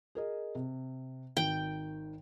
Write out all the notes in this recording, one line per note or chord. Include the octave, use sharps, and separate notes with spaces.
G#4 A#4 D#5
C3
G#1 D#3 G5